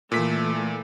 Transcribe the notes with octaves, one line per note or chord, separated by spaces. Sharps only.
A#2 E3 A3 B6